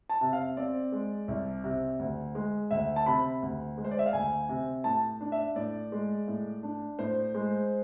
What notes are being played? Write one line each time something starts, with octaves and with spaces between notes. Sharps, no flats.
A5
C3
F5
C4 D5
G#3
C2
C3
D2
G#3
D2 E5
A5
C3 B5
D2
G#3
C5
D5
E5
F5
D2 G#5
C3
A2 A5
D4
E5
A2 D5
G#3
A2
D4
A2 C5
G#3